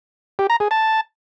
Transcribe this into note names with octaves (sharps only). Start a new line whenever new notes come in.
G4
A#5
G#4
A5